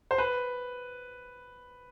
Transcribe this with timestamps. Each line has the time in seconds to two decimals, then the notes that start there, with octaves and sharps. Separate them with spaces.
0.11 C5
0.18 B4